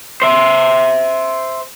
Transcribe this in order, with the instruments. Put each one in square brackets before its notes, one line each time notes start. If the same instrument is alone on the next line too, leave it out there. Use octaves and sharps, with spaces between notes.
[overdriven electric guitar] C5 E5